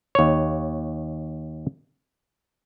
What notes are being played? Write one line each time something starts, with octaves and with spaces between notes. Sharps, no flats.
D#2 C#5